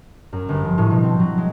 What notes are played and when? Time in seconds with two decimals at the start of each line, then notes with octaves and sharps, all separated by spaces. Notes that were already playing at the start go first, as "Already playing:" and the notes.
0.33 F#2
0.49 G1
0.65 F3
0.78 A2
0.90 B2
1.03 C4
1.20 F#3
1.38 G#3